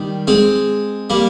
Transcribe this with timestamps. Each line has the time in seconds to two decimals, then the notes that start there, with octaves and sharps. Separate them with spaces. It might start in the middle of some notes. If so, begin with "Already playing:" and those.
Already playing: D#3 G3
0.27 G#3 C4
1.10 G3 A#3